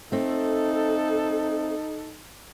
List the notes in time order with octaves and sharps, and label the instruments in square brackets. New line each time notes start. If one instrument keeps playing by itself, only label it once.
[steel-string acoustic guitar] A3 C4 [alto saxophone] D#4 [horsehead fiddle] A4